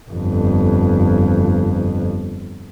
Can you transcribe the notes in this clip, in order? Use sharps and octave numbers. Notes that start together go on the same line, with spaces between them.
G1 F2